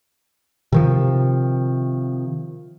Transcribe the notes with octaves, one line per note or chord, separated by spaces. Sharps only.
C3 D#3 F3